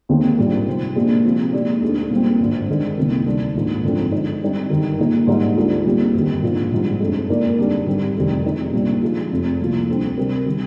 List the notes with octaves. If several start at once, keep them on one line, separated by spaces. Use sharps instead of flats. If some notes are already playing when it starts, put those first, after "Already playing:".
D#2 D#3 G#3 C4
A#1 G#2 G3 A#3
C3 G3 C4
A#1 A#2 G#3 D4 G4
C3 F3 C4 D#4
A#2 G#3 D#4 G4 D5
D2 D3 G#3 D4 G#4
A#2 G3 C4
G#1 G2 D3
G2 D#3 G#3 D4
C2 C3 D#3 A#3
D2 C3 G3 D4
A#1 G#2 D#3
G#1 G2 D3 F3 C4
D3 G#3 D#4
D3 G3 C4 D#4
G1 G2 D#3
A#2 G#3 D#4
G#2 G3 A#3 D#4 G4
D2 D3 G#3 D4 F4
A#2 G3 C4 G4
G1 F2 D#3
A#1 G#2 F3 G#3
A#1 G#2 G3
G1 F2 D3 G#3
A#2 G#3 D#4 A#4 D5
F2 D3 G3 D4 G4
G#1 G#2 G3 C4 G4
F1 F2 D#3 G3
C3 F3 G#3 D#4 G4
A#1 A#2 G3
D3 F3 G#3
F1 F2 C3
C2 A#2 F3
D2 D3 G3 C4
C3 G3 C4 G4 A#4
D#3 G3